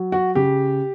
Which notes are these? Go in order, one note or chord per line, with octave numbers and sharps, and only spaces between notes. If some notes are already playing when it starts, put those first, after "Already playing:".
Already playing: F#3
F#4
C#3 G4